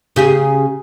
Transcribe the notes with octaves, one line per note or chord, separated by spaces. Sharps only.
C#3 G4 G#4